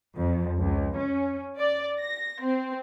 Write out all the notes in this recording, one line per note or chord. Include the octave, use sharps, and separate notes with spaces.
F2
C#2
C#4
D5
A#6
C4